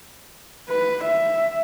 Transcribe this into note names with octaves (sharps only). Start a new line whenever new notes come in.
B4
E5